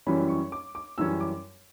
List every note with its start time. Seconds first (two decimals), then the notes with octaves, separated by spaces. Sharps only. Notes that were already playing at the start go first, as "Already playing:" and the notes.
0.07 F#2 E3 G3 C#4 B5
0.29 C#6
0.52 D6
0.75 D6
0.98 F#2 E3 G3 C#4 E6
1.21 D6